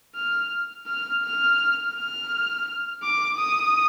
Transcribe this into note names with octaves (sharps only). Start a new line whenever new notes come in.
F6
F6
F6
F6
D6
D#6